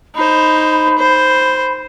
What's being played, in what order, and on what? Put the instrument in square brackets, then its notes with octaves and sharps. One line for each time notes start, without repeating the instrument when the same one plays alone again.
[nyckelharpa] D#4 C5 [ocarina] B5
[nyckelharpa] C5